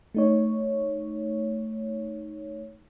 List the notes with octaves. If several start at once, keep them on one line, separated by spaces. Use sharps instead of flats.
A3 D#4 C#5